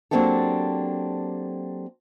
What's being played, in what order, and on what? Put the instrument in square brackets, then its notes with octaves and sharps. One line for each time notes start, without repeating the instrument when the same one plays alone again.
[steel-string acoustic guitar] F#3 A#3 C4 D4 G4 A4